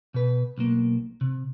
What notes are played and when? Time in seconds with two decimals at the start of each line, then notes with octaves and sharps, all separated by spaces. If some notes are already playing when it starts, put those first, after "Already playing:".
0.14 B2 B4
0.58 B1 A#3
1.21 C3